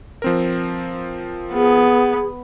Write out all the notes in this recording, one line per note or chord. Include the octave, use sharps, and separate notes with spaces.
F3 C4 A#4
B3 G#4